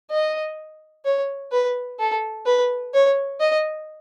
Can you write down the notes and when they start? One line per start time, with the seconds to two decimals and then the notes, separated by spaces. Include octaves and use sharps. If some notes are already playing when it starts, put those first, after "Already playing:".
0.11 D#5
1.05 C#5
1.52 B4
1.99 A4
2.46 B4
2.94 C#5
3.40 D#5